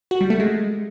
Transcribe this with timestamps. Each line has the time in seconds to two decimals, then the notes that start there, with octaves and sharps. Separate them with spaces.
0.11 F#4
0.21 G3
0.30 A3
0.40 G#3